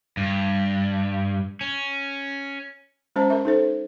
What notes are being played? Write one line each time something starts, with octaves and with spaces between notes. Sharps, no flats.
G2
C#4
G#3 C#4 C5 A5 A#5
A#4 E5
D#4 A4 C5